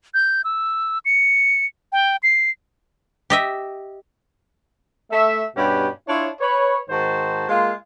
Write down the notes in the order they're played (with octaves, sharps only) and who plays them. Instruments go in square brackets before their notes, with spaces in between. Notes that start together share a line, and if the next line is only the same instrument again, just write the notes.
[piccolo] G6
E6
C#7
G5
C7
[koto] G4 D#5 E5
[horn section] A3 E5
G2 B2 C#4 G4 B4
D4 E4 F4 C#5
B4 C#5
G#2 D#3 F#4 C5 A5
G#3 A#3 F4